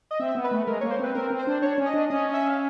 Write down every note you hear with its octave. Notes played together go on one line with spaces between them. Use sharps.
D#5
C4 E5
B3
B4
A3
G#3 A#4
A#3 C#5
C5
C4 B4
C4 A#4
C4
C5
D4
D4 C#5
C#4
D#5
D4
C#4 D#5
E5
F5